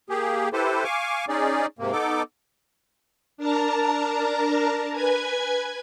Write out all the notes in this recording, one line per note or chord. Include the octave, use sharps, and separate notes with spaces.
A#3 G4 G#4
E4 G4 A4 B4 C5
F5 G#5 C#6 D6
C#4 D#4 G#4 D5
G#2 C3 A#3
B3 D#4 A4 D6
D4 A#4 A5 A#5
B4 G#5 G#6